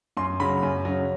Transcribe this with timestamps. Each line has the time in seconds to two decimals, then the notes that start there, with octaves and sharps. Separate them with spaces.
0.17 F#2 C6
0.40 C#3 F#3 B5
0.63 F#2
0.85 C#3 F#3